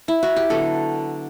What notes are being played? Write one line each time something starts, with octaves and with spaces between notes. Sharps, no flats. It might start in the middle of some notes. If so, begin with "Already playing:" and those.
Already playing: D4
E4
F#4
G4
D3 F#3 B3 A4